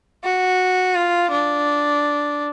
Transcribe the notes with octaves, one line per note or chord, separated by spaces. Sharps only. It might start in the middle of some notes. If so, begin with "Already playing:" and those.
F#4
F4
D4